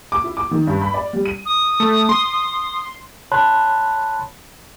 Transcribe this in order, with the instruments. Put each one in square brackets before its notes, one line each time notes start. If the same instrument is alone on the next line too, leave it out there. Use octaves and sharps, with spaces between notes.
[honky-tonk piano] D6
E4
D6
D#3
G2
B5
D5
G3
D#7
[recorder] D#6
[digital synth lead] A3
C6
[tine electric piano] C#5 A5 B5 C6 F#6